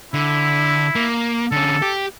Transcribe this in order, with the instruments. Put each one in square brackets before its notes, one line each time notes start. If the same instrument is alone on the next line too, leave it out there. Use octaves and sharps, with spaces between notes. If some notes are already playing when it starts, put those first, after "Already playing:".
[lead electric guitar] D3 [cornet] E4
[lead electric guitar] A#3
[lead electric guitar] D3 C#4 [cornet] A4
[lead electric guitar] G4